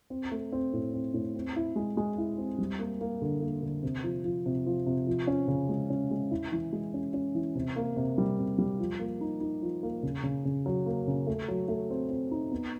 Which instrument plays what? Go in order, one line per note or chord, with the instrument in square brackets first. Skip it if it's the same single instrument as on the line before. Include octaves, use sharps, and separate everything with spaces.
[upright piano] C4
A3
C4
A2
C4
A2
C4
E4
G#3
G#3
E4
C4
G3
A#3
A#3
D3
A#3
D3
C3
F3
F3
C3
F3
C3
F3
C#4
C#3
G#3
C#4
G#3
E4
E3
G#3
C#4
C#4
E3
C3
A#3
C3
G3
C3
G3
F3
A#3
D#4
D#4
F3
A#3
C#3
C#3
C#3
F#3
A#3
C#3
A3
F#3
A3
C4
C4
D#4
B3